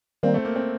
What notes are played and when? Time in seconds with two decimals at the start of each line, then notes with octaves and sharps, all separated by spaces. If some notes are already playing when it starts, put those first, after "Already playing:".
0.23 D#3 G3 A#3 C4
0.34 A3
0.45 A#3
0.56 C4